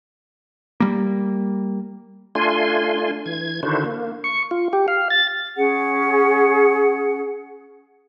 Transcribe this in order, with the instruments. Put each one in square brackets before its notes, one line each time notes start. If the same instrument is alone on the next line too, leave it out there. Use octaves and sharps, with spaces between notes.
[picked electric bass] G3 A#3
[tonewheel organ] A3 D4 F4 G#5 C6
E3 G#6
D3 D#3 D4 E4 F#4 C5
A#3
C#6
F4
G4
F5
A6
[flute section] C#4 G#4 F#5